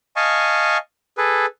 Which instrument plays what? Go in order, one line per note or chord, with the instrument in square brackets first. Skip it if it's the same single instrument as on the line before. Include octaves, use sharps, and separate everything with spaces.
[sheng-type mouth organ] D#5 F5 G#5 A5 C#6
G#4 A4 B4